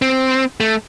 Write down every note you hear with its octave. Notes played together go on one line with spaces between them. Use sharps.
C4
A3